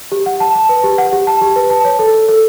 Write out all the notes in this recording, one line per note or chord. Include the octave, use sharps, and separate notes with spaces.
G4
F#5
A5
A5
B4
G4
F#5
G4
A5
G4
B4
A5
C#5
A4
A4
A4